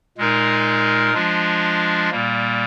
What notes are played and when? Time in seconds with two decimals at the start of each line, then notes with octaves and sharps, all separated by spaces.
0.18 A#2 G#3 D#4 A#4
1.14 F3 G#3 D4 F4
2.11 A#2 G3 A#3